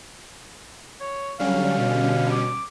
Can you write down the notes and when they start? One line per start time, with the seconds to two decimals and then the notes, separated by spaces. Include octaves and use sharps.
1.01 C#5
1.39 D3 F#3 G3 C#4 F5
1.77 B2
2.30 D6